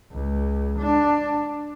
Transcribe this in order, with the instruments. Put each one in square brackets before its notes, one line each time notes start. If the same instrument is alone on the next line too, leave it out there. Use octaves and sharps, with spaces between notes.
[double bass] C#2
D4